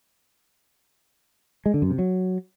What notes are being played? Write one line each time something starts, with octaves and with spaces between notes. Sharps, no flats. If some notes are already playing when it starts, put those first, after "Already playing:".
G#3
D3
F#2
C3
F#3